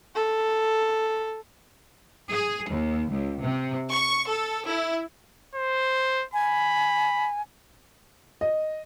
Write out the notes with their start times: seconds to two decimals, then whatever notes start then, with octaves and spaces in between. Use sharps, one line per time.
0.15 A4
2.32 G#4
2.70 D#2
3.12 C#2
3.43 C3
3.92 C#6
4.28 A4
4.67 E4
5.55 C5
6.34 G#5 B5
8.41 D#5